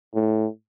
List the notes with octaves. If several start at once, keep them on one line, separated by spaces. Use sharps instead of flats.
A2